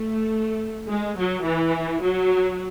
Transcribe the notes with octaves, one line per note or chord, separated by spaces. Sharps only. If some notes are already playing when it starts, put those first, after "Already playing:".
Already playing: A3
G#3
F#3
E3
F#3